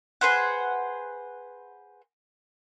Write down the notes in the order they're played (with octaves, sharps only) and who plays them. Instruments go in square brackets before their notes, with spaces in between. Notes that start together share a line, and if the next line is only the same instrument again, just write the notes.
[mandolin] G#4 B4 C5 F#5